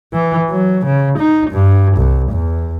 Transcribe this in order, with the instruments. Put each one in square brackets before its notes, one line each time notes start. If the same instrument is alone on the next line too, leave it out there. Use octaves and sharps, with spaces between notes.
[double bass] E3
F#3
C#3
D#4
G2
C2
E2